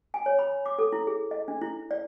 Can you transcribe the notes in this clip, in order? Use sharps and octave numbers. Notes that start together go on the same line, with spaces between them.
G#5
C#5
B5
D6
A4
E4
G#4
D#5
D4
E4
D5